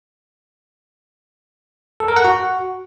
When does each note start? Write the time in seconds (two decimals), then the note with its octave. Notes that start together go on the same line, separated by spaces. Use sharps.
2.00 A4
2.08 A#4
2.16 F#5
2.25 F#4